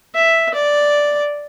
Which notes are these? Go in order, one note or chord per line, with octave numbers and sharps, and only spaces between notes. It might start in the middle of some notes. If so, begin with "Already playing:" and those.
E5
D5